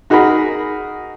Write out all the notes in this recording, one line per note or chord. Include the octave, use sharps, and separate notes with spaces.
D#4 F#4 G#4 A#4 B5